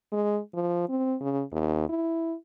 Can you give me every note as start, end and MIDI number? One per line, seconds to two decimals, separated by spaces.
0.12 0.39 56
0.54 0.89 53
0.89 1.15 60
1.21 1.42 49
1.52 1.85 39
1.89 2.35 64